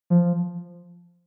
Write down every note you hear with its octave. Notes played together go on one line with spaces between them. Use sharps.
F3